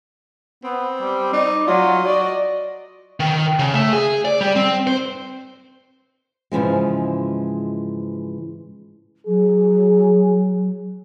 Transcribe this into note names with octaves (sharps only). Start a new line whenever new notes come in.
B3 C4
G3
D#4 D5
F#3 F4 D#5
F#4 D5
D#3
C#3
A3
G#4
D5
G3
C4
C5
G#2 C#3 E3 F3 G#3
F#3 G#4